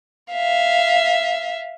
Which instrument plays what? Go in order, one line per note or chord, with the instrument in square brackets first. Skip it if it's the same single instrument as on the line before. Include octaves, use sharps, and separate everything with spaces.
[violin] E5 F5